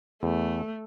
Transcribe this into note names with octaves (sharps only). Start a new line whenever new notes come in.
E2 A3